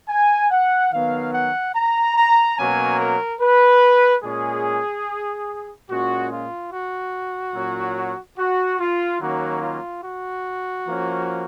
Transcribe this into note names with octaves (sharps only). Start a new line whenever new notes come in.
G#5
F#5
D#3 F#3 B3 F5
F#5
A#5
A#5
B2 F#3 A#3 C#4 G#5
A#4
B4
A#2 G#3 C#4 G#4
A#2 G#3 C#4 F#4
F4
F#4
A#2 F#3 C#4
F#4
F4
D#3 F#3 A#3 C#4 F#4
F4
F#4
F3 A#3 C#4